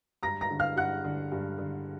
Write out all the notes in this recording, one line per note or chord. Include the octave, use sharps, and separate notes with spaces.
G2 A#5 A#6
A#5 A#6
D3
F5 F6
G2 F#5 F#6
D3
G2
D3